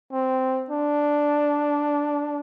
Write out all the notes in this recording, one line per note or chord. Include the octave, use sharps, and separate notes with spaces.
C4
D4